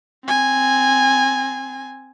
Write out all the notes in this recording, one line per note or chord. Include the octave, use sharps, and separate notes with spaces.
C4 G#5